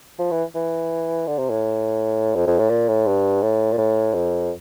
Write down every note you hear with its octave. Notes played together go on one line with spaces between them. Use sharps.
F3
E3
E3
D3
C3
A2
F2
F2
A2
A#2
A2
G2
A2
A#2
A2
F2